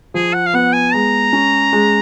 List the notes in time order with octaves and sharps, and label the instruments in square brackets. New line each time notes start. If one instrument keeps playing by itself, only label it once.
[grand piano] F3 [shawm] G#4
[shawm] F#5
F5
[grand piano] B3 [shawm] F#5
[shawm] G#5
[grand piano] G#3 [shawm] A#5
[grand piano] C#4
G#3